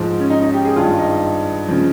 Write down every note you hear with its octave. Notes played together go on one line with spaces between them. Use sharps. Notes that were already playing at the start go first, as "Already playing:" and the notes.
Already playing: G#2 F3
C#4
D#4
D#4
G4
G#4
G2 D#3 F4
D#4
C#3 F3